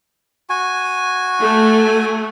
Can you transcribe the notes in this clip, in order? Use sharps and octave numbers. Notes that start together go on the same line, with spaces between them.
F#4 G#5
A3